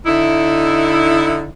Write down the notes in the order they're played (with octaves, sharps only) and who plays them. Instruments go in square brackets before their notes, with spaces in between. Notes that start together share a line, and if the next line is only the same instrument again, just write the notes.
[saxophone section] D3 D#4 E4